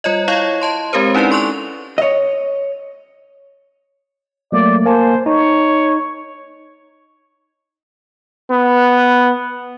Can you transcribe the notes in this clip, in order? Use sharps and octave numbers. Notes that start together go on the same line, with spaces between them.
G3 F4 C#5 D#5
E4 C#5 D#5 F5 C#6
D#5 A5 C6
G#3 C4 G4 A#4 C5
C#4 D#4 E4 B4 D5
A4 C6 C#6 F#6 F7
C#5 D#5
F#3 A3 A#3 D5
A#3 C5 G#5 A5
D#4 C#5
B3